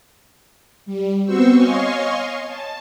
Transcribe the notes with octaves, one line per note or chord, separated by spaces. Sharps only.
G3
B3 C4 F#4 C5 C#6 E6
C#5 D#5 F5 G#5 C6 C#6
A5